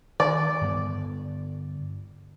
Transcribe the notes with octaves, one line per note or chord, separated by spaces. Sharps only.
D#3 D5
G2 D3 B3